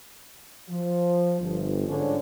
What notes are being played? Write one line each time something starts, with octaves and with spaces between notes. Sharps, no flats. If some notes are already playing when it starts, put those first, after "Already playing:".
F3
G1
G#2 D3 F3 C#4 D4 C#5